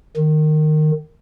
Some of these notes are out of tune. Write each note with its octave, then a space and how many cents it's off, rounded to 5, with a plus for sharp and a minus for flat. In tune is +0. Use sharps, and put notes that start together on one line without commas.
D#3 -20